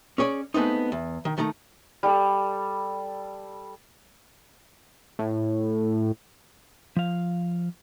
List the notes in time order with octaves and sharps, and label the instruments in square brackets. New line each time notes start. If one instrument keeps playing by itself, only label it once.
[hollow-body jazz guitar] C#4 G#4 C#5 D5
G#3 A3 B3 C4 D#4
E2
D#3
D#3 A3 D#4 A#5
[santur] G3 A4
[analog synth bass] A2
[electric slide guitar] F3 F5